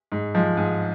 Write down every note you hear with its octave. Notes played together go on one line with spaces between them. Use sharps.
G#2
F3 G#3
G#2